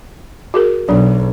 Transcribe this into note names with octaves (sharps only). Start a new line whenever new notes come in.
F#4 G#4 A#4
B1 F#3 D4